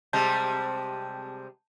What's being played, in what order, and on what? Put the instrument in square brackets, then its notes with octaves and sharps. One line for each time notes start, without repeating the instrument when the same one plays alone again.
[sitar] C3 G3 G#3 [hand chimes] A5 G6